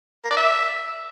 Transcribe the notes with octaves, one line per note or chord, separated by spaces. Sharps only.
A#4
D5
E5